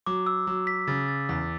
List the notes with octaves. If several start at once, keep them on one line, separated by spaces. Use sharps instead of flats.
F#3 D6
E6
F#3
B6
C#3 A6
A6
E2 B6